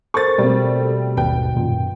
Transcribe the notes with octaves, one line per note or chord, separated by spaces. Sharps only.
A4 A#4 C5 C#6 A6
B2 G3 A3 C4
G#1 D#2 B4 G5
F#2 A#2 D#3